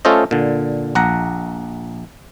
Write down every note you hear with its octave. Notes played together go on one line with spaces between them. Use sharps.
A3 C#4 F4 A4 C5 D#5
A#2 D3
A#1 F#5 A#5